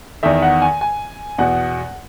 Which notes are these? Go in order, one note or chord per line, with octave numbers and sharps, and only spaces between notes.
E2 D#3 E5
F#5
G#5
G#5
E2 B2 F#5